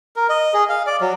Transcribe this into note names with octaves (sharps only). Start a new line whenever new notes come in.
A#4
D#5
G#4
F5
D5
F#3